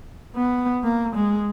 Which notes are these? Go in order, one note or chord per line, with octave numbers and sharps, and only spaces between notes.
B3
A#3
G#3